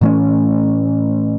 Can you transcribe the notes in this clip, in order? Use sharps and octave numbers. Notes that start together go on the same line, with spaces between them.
A2 E3 A3 C#4